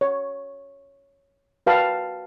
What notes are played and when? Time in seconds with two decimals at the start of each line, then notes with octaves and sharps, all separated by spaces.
0.01 C#5
1.67 F#4 B4 F5 G5 A5